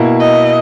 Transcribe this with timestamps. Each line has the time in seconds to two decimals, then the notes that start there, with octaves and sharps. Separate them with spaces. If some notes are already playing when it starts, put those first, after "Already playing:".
Already playing: B2 A#3 E4
0.20 D#5